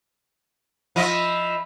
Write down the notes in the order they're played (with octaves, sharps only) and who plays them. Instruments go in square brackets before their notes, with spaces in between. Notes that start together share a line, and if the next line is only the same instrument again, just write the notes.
[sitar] F3 D#5 E5 [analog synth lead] B5